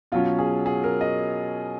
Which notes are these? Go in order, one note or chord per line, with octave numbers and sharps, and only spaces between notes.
B2 F#3 C#4 F4
G#4
G#4
A#4
D#5